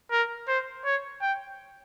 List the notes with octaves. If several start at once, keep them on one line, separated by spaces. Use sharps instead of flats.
A#4
C5
C#5
G5